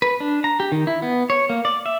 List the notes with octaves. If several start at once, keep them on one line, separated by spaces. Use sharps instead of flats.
B4
D4
A#5
G4
D#3
E4
B3
C#5
A#3
D5
E5